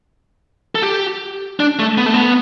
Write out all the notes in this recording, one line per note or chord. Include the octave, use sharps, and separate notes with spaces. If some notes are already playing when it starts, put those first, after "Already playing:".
A4
G4
D4
A3
B3
A3
B3